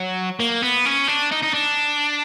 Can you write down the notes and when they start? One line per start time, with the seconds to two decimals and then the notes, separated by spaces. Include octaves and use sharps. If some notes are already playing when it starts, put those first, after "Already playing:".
Already playing: F#3
0.40 A#3
0.62 B3
0.86 C#4
1.08 D4
1.31 D#4
1.42 D#4
1.54 D4